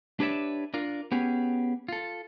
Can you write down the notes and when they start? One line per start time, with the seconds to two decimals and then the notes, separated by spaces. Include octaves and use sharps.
0.20 D4 G4 B4 C#5 D5 E5
0.74 D4 F4 A#4
1.12 B3 C#4 G4 G#4
1.88 F4 A4